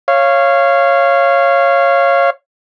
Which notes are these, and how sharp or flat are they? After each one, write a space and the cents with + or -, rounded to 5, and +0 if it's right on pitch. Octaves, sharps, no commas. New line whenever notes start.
C#5 -10 F5 -15